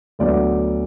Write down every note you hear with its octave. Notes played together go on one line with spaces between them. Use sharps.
D2 D3 F#3 B3 D5